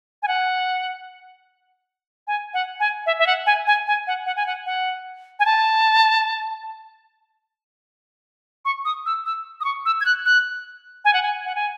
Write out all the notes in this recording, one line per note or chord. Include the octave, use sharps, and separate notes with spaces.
G#5
F#5
G#5
F#5
G#5
E5
E5
F#5
G#5
G#5
G#5
F#5
F#5
G#5
F#5
F#5
G#5
A5
C#6
D#6
E6
E6
D#6
C#6
E6
G#6
F#6
F#6
G#5
F#5
G#5
F#5
G#5